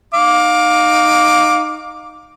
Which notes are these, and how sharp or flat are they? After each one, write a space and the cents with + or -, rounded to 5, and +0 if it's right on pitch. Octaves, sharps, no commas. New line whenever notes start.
D#4 -10 F5 +25 D6 +0